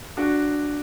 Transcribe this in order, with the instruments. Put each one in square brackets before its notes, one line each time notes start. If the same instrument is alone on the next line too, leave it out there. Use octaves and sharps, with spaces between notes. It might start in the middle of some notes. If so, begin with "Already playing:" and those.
[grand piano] D4 F#4